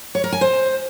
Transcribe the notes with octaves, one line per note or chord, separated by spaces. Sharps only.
C#5
A#4
G#5
C5